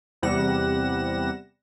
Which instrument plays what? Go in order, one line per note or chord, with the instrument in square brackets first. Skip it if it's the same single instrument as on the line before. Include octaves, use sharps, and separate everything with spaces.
[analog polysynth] E2 C3 G3 F#5 A#6 E7